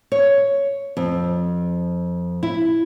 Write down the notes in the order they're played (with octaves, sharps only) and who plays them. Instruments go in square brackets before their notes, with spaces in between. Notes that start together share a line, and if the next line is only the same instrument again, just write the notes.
[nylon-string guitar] C#5
F2
E4